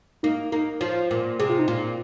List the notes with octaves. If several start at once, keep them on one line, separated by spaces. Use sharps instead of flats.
A#3 D#4
A#3 D#4
F3 F4
A#2
C3 G#4
F4
D#4
A#2 F4